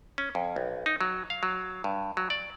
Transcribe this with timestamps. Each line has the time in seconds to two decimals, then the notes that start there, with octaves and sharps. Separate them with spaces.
0.18 C#4
0.35 F2
0.56 B1
0.86 D#4
1.01 F#3
1.30 F5
1.43 F#3
1.84 G2
2.17 F#3
2.30 D5